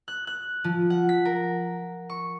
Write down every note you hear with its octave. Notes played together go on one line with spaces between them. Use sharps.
F#6
F#6
F3
F#5
B6
A#4
C#6